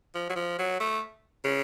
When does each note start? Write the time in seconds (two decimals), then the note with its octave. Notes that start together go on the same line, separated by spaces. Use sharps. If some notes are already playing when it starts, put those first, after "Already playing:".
0.15 F3
0.30 F#3
0.36 F3
0.59 F#3
0.80 A3
1.44 C#3